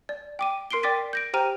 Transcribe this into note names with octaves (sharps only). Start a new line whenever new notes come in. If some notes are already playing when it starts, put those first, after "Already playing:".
D5
G5 D6 D#7
A#4 C6 C7 D7 G7
D5 G5 D6 A6 B6 D#7
G6 A#6 D7
G4 C5 G5 A#5 F6 D#7